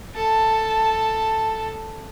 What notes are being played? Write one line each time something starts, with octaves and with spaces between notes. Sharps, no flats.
A4 A5